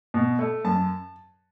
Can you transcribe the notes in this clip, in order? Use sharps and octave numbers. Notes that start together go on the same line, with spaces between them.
B2
A3
F#2 A5